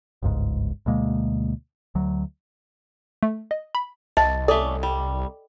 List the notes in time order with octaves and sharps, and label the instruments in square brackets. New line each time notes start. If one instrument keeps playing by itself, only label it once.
[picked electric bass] G1 C#2 G#2
D2 B2 G#3 A#3
D2 F#3
[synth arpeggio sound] A3
D#5
B5
[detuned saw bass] C2 [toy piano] D#5 [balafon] A5
[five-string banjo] A3 C#4 D5 [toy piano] A4
[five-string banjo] G3